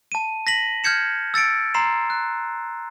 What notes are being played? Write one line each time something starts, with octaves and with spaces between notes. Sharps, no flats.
A5 D#7
A#6 B6 F#7
F6 G6 G#6 C#7 E7
E6 A6 C#7 D7
A#5 C6 C7 E7
F#6